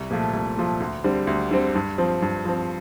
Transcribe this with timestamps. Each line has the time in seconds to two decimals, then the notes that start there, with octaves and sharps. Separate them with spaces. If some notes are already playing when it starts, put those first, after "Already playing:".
Already playing: C2
0.11 A#2 F3 A3
0.33 C2
0.57 A#2 F3 A3
0.80 D2
1.04 D3 G3 C4
1.27 D2
1.51 D3 G3 C4
1.75 G2
1.98 F3 C4
2.22 G2
2.45 F3 C4